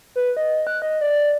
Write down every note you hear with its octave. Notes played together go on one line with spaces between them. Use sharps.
B4
D#5
F#6
D#5
D5